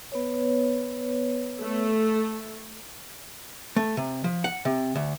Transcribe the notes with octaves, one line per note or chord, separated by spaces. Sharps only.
B3 B4 C#5
A3
A3
C3
F3
F#5
C3
D2